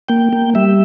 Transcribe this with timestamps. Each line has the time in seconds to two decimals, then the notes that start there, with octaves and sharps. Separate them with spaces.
0.09 A#3 G5
0.33 A#3
0.55 G3 E5